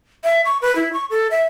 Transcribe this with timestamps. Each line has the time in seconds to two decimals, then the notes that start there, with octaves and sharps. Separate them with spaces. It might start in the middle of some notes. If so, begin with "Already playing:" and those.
0.24 E5
0.45 C#6
0.62 B4
0.75 E4
0.93 C#6
1.10 A4
1.31 E5